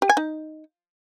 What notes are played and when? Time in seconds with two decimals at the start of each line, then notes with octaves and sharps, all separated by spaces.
0.02 G4
0.09 G#5
0.17 D#4